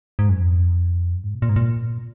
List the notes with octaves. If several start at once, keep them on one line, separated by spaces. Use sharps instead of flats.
G#2
F#2
F2
F#2
G#2
B2
A#2
G#2
A#2